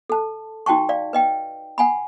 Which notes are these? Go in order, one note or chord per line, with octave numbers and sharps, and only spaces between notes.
A4 A5
D#4 F#4 G5 A5 C#6
D5 F5
B4 D#5 G5
F#5 G#5 B5